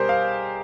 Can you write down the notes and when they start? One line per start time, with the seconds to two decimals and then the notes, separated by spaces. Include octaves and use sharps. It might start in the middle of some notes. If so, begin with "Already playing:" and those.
Already playing: B2 G3 G4 G#4 A#4 C5
0.09 F5